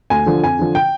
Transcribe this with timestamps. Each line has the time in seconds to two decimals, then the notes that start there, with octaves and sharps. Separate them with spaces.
0.10 D2 G#5
0.26 D3 F3
0.43 F2 G#5
0.59 D3 F3
0.75 G5